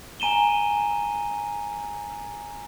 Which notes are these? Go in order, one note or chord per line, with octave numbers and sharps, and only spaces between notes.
G#5 A#5 D#7 E7 G7